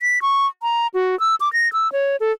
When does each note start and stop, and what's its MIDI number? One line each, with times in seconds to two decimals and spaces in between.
0.02 0.22 95
0.22 0.47 85
0.62 0.87 82
0.94 1.18 66
1.20 1.35 88
1.40 1.51 86
1.53 1.71 94
1.73 1.90 88
1.92 2.16 73
2.20 2.32 69